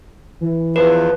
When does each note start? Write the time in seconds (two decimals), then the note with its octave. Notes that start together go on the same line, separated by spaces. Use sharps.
0.41 E3
0.76 E2 F3 B4